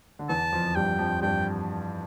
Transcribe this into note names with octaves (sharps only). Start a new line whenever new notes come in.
D3
E2 E3 A5
F2 F3
G2 G3 G5
F2 F3
G2 G3 G5